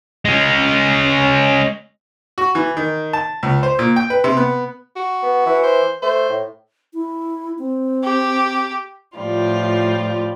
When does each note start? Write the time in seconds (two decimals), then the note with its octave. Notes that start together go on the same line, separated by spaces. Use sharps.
0.25 G#3 C#4
2.38 F#4
2.55 E3
2.77 D#3
3.13 A5
3.43 C#2
3.63 C5
3.79 A#2
3.96 G5
4.10 B4
4.24 C3
4.37 B3
4.96 F#4
5.22 B3
5.46 E3
5.64 C5
6.03 A3 C5
6.29 A2
6.94 E4
7.59 C4
8.04 G4
9.18 A2 F3 G3 F4